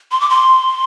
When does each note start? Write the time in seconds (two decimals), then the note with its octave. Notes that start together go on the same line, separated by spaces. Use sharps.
0.11 C6
0.21 D6
0.30 C6